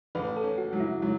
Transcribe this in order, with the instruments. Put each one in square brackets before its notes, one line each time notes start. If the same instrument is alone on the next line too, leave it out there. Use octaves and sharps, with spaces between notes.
[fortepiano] A1 [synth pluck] B4
[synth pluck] A4
[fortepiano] C#4
[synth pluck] F#4
[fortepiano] F#3 [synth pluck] F#4
[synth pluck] E4
[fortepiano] F#3